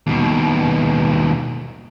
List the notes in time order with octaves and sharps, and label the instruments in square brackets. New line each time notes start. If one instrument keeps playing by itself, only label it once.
[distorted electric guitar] D#2 B2